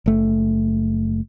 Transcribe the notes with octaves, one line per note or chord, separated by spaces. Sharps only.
F#1 A3